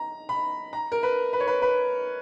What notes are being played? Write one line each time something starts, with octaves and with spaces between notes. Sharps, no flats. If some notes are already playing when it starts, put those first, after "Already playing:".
Already playing: A#5
B5
A#5
A#4
B4
B4
C#5
B4
B4